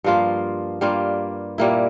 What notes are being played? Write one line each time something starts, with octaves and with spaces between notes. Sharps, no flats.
G2 F3 A#3 F4
G2 G3 A#3 F4
A#2 G3 A#3 E4